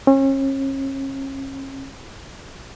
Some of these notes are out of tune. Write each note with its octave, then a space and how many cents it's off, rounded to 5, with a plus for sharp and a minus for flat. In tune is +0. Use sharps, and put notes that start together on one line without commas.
C#4 -35